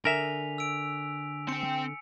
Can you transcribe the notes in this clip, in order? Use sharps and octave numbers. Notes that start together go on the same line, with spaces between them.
D3 A#4 E5 G#5 B6 F7
E6 D7
C4 G5 C#7